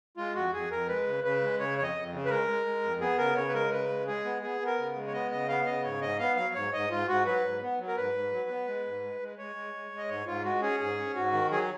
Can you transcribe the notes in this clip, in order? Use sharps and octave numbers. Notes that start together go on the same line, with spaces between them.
G#3 F4
F2 F#4
F2 G#4
F2 A#4
G#3 B4
C#3
C#3 B4
G#3
C#3 C#5
F2 C#5
D#5
F2
C#3
B4
G#3 A#4
G#3
G#3
F2
B3 G#4
C#3 A#4
C#3 C#5
B4
G#3 A#4
C#3 B4
G#3
G#3 G#4
B3
B3 G#4
B3
A#4
C#3
G#3
C#5
B3 D#5
C#3 D#5
B3 F5
C#3 D#5
G#2 C#5
G#2 D#5
B3 F5
F#3 F5
G#2 C#5
G#2 D#5
G#2 F4
G#2 F#4
F#3 B4
G#2
B3
F#3
A#4
G#2 B4
G#2
F#3
B3
G#3
G#2
G#3
G#3
G#3 C#5
G#3
G#3
G#3
D#5
G#2 C#5
G#2 F4
G#3 F#4
C#4 G#4
G#2 G#4
C#4
G#2 F#4
D#3
F#3 G#4